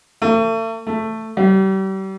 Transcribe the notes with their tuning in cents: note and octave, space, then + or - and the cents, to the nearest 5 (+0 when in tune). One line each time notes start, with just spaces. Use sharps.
A3 +40
A3 +10
G3 -35